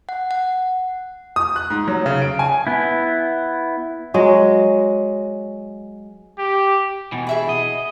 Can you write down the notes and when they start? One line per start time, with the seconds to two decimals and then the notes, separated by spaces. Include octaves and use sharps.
0.09 F#5
0.31 F#5
1.36 D#6
1.56 F#6
1.70 G#2
1.88 F#3
2.06 C#3
2.22 D7
2.39 G#5
2.67 B3 E4
4.14 F#3 G#3
6.38 G4
7.12 B2 E3
7.27 G#4 E5 B5
7.49 D#5